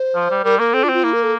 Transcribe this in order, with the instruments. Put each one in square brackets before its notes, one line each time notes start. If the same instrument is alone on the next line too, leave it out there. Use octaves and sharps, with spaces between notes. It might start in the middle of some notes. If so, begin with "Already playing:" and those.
Already playing: [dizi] C5
[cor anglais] F3
G3
[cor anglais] G3 [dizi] A#4
[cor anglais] A#3 [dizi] A#4
[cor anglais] C4 [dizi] A4
[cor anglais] D4 [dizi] F4
[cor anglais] C4
[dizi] F4
[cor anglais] A#3 [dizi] E4
[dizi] A#4
A4